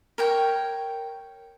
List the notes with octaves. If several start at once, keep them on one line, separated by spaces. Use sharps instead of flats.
A#4 C#5 G5